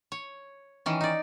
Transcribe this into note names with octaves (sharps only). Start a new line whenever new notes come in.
C#5
D#3 E3 C#4
D#4 D5